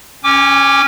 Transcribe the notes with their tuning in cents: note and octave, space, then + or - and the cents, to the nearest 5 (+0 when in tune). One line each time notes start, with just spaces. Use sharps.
C#4 +0 G#5 -45 D6 +0